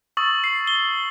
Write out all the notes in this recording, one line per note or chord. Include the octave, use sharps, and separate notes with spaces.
C#6 D#6 E6 A6 F#7
C7
G7